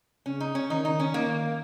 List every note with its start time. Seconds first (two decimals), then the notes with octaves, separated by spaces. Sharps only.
0.26 C#3 C#4
0.40 D#4
0.55 C#4
0.70 D#3 D#4
0.85 D#4
1.00 C#4
1.14 D#3 A#3